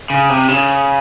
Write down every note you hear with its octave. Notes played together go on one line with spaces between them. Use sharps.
C#3
C3
C#3